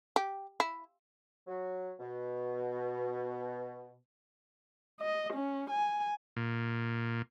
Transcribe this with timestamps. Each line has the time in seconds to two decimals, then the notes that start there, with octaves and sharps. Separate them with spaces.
0.16 G4
0.60 E4
1.47 F#3
2.00 B2
5.00 D#5
5.33 C#4
5.70 G#5
6.37 A#2